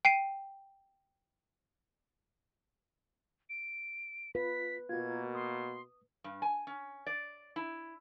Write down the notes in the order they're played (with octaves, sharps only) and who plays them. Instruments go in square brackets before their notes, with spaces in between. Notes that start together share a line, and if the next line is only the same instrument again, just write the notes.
[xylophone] G5 C7 D#7
[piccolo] D7
[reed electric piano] F4 [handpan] B4 [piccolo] B6
[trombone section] B2 A#3 [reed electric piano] F4 F#4 [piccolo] G#6
[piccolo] C6 [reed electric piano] D#6
[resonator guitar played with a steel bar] G2
G#5
C#4
D5
E4